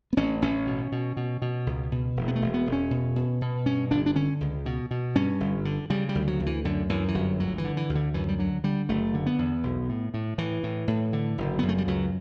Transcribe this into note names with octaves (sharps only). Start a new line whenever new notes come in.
B3
A1 C#4
A1 C#4
B2
B2
B2
B2
C#2
B2
E1
B3
A3
E1
B3
E1
C#4
B2
B2
B2
G2 C#4
G1 D4
D4
D3 C#4
C#2
B2
B2
G2 C#4
G1
D3
C#3 G3
G3
D2
F#3
D2
E3
F#2 D3
F#2 E3
E3
G1 F#3
D2 F#3
E3
D3
E3
D2
D3
F#2 E3
G3
D3 F#3
D3 G3
F#1 A3
D3
B3
E2
B1
A2
A2
A2 E3
A2
A2
D3
F#1
F#2 B3
A3
G3
C#2 F#3